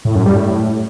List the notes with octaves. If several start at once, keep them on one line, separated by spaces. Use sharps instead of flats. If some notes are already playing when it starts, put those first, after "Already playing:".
A2
F#2
G3
A2